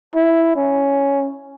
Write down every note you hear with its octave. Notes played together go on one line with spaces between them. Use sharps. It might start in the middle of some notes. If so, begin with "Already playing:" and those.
E4
C#4